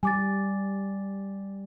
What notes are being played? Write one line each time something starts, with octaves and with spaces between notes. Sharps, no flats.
G3 G#5 D6 A6